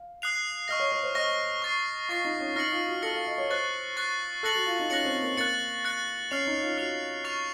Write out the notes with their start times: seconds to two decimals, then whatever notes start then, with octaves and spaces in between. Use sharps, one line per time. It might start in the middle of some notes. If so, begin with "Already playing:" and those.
Already playing: F5
0.22 D#6 F#6 C7 F7
0.68 D#5 C#6 F6 A#6
0.80 C#5
0.92 C#5
1.03 C5
1.15 D#5 C#6 F6 A#6
1.62 C#6 A6 C7
2.09 F4 C#6 A6 C7
2.25 D#4
2.40 C#4
2.56 D#4 F6 A#6 C#7 F#7
2.72 F4
2.87 F#4
3.02 A4 F6 A#6 C#7 F#7
3.14 F5
3.26 D#5
3.38 C#5
3.50 C5 C#6 F#6 A6 C7
3.97 C#6 F#6 A6 C7
4.43 A4 F#6 A#6 C#7 F#7
4.55 F#4
4.67 F4
4.79 D#4
4.90 C#4 F#6 A#6 C#7 F#7
5.06 C4
5.22 A#3
5.37 A#3 F#6 A6 C#7
5.85 F#6 A6 C#7
6.31 C#4 F6 C7 F7
6.47 D#4
6.62 F4
6.78 F#4 F6 C7 F7
7.24 C#6 F6 A6 C7 F7